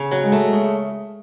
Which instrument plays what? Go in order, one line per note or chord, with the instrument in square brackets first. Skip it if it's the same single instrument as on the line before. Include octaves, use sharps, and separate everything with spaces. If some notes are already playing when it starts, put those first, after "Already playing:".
Already playing: [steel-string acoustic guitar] C#3
F#3
[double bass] G#3
[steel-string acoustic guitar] A3
C#3